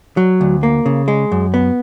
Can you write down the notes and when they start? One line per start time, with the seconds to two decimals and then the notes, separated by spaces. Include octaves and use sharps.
0.17 F#3
0.41 D2
0.63 A#3
0.86 C#3
1.08 G#3
1.32 F#2
1.54 B3